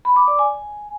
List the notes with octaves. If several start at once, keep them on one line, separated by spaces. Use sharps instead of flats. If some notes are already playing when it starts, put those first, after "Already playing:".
B5
D6
D5
G#5